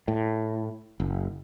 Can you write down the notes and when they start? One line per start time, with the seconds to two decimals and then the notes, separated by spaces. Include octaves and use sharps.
0.08 A2
1.00 F#1